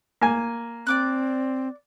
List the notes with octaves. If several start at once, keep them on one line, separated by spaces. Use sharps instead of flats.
A#3 G#5
C4 D5 D6 F#6